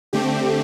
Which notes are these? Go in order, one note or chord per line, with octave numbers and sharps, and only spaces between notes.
D3 A3 C4 G4